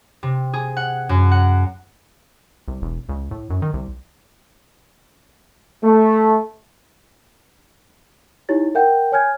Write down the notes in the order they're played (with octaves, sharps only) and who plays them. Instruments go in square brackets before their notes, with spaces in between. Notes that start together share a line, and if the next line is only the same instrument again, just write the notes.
[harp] C3
G#4
F#5
F#2
F#5
[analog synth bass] C2
E1
C#2
A2
F#2
D#3
C2
[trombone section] A3
[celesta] D#4 E4 G4 C#5 A6
A#4 E5 F#5 G5 G6
C#5 G#5 F6 G6 G#6